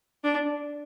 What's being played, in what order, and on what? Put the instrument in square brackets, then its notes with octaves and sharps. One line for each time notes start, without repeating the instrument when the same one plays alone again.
[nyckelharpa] D4